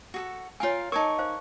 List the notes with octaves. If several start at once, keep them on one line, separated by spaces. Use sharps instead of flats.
F#4 G#4 A4
F4 A#4 C#5 F5 G#5
D#4 A#4 G#5 A5 C#6 D6
C5 F5